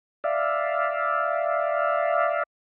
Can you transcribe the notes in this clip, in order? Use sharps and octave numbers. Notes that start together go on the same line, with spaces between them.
D5 E5 F5